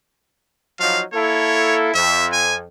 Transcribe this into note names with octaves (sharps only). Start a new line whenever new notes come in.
F3 F#3 D#4 F5
A#3 E4 A4 C#5
F2 E5
G#5